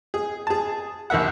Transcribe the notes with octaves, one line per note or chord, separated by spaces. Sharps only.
G#4
G#4 A5
A#1 D#2 A#3 E5 F#5